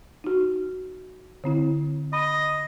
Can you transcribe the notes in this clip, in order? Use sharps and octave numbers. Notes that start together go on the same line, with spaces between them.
D#4 F#4
D3 C4 E4
D#5 B5